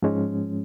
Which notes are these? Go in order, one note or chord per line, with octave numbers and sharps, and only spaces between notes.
G#2 F3 G#3 C#4